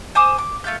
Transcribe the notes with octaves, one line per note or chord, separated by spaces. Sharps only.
C5 G#5 D6 D#6
D6
A3 F4 F5 G6